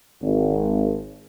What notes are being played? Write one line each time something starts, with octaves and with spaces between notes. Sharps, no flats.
G#1